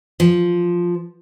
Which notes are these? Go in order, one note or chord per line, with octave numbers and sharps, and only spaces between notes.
F3